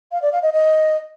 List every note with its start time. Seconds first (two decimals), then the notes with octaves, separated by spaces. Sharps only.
0.12 F5
0.22 D5
0.32 F5
0.43 D#5
0.53 D#5